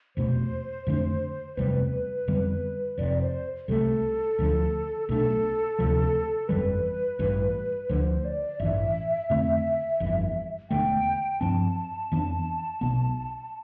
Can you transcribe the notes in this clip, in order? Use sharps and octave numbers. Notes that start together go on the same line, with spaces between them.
F1 E2 B2 A3 C5
F2 D3 A3 D4
F1 E2 C3 G3 B4
F2 D3 G3 B3
F1 F2 C3 D5
C5
C2 C3 F3 A3 A4
D2 D3 F3
B1 B2 A3 D4 A4
D2 C3 F3
G1 F2 E3 G3 B4
A1 G2 E3
D2 D3 F3 C5
D5
A1 G2 E3 E5
F2 D3 A3 C4
G1 F2 E3
E1 E2 D3 A3 G5
G2 F3 C4 A5
F2 E3 B3 D4
B1 B2 B3